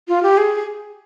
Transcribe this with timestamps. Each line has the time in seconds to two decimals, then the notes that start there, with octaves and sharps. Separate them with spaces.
0.08 F4
0.23 G4
0.37 G#4